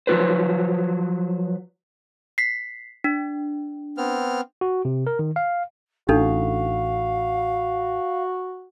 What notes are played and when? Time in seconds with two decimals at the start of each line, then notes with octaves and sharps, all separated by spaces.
0.07 F3 F#3 A#3 F4 B4 C5
2.38 B6 C7
3.04 D4
3.98 B3 C4 F6
4.61 F#4
4.85 C3
5.07 A#4
5.19 D#3
5.36 F5
6.09 A1 D4 D#4 F#4 A4 F5